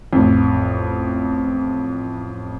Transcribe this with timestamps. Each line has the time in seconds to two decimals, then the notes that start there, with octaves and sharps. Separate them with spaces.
0.13 A1 F2